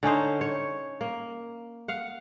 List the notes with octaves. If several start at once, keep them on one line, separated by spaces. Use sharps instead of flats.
D3 C#4 D#4 C5
C#5
A#3
F5 F#5